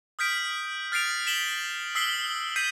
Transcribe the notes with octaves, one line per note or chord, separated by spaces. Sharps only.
D#6 F6 G6 B6 D7
F6 A6 C7 D7 F7
B6 E7 F#7 G7
D#6 E6 B6 C7 F#7 G7
G6 B6 C7 D#7